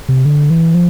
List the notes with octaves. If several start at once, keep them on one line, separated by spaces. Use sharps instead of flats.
C3
D3
E3
F3